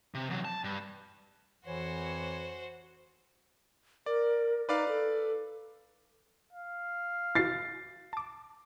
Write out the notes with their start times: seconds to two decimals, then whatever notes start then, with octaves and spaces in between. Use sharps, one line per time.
0.14 C3
0.30 E2 F#3
0.45 A5
0.64 G2
1.66 F2 E3 F#4 C5 C#5
4.06 A#4 D5
4.69 D#4 B4 D5 F5
4.88 A4
6.53 F5
7.35 E4 F#4 A6 C7
8.13 A5 D6